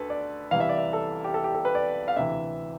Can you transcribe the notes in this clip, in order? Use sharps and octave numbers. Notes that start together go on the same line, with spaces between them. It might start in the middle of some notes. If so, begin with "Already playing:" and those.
Already playing: D2 A4 B4
D5
C2 C3 E3 F5
E5
D5
E5
A4
G4
A4
G4
A4
B4
D5
F5
D2 C3 E3 E5